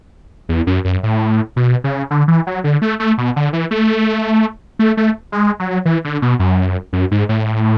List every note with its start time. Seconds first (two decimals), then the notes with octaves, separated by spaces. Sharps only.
0.49 E2
0.67 F#2
0.85 F#2
1.03 A2
1.56 B2
1.84 C#3
2.11 D3
2.28 E3
2.47 F#3
2.64 D3
2.82 A3
3.00 A3
3.18 B2
3.36 D3
3.53 E3
3.71 A3
4.79 A3
4.97 A3
5.32 G#3
5.60 F#3
5.85 E3
6.04 D3
6.22 B2
6.39 F#2
6.93 F#2
7.11 G#2
7.29 A2